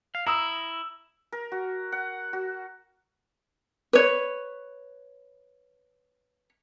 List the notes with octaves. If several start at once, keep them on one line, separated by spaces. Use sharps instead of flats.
F5
E4 A#5 D#6 E6
A#4
F#4
F#5
F#4
B4 C#5